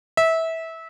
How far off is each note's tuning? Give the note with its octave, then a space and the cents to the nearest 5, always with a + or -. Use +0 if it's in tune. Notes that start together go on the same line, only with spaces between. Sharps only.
E5 -20